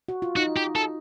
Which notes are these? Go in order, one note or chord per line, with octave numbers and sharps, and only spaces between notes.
F#4
F4
D#4 F#4
G4
A4